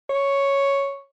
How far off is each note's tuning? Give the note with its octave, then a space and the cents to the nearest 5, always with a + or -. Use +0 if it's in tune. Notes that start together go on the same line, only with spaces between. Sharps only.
C#5 +0